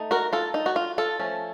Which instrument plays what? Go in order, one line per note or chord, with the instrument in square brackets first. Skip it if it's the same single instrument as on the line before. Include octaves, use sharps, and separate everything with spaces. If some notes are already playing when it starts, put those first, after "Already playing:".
Already playing: [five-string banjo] A3 D#4
F#4 A#4
F4 A4
D#4
F#4
F4
F4 A4
F3 A3 C#4